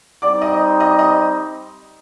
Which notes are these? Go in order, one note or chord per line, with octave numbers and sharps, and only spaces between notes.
G3 C4 D#4 D5 D6
D#5 D#6
D#5 D#6
D#5 D#6